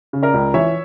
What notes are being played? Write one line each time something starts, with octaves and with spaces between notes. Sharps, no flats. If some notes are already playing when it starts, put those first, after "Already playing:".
C#3
A#4 D5
C#2
E3 C#5 E5